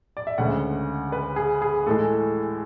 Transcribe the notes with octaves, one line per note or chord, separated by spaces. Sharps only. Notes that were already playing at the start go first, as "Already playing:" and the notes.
D5
E5
D2 C#3 G#3 C#4 F#5
B4
G#4
G#4
A2 E3 G#3 A4